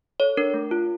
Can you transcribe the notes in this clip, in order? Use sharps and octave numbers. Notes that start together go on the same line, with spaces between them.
A4 C#5
D4 A#4
A3
F4